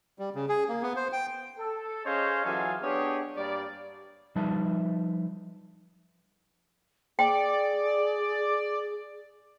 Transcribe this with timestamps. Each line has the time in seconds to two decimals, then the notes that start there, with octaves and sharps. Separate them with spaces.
0.19 G3
0.35 C#3
0.49 G#4
0.69 A#3
0.83 B3
0.96 C5
1.12 G5
1.59 A4
2.05 C#4 G#4 C5 C#5 D#5 F5
2.44 E3 F#3 F4 G#4 A4 G#5
2.82 B3 D4 G4 G#4 C#5 D#5
3.37 G2 G3 A#3 D5
4.35 F3 G3 D#4 B4 E5 A5
7.19 G#4 D5 G5